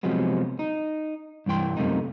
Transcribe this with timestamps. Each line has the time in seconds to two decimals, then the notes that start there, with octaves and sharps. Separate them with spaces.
0.03 C3 F3 F#3 G#3 B3
0.59 D#4
1.46 C2 G2 E3 G5 C6
1.77 F#2 C3 A3 A#3 D#4